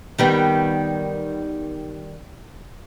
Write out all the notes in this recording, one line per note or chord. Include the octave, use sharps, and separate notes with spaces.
D#3 G3 B3